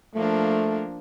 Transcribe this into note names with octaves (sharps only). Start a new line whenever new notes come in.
F3 A3 A#3 D4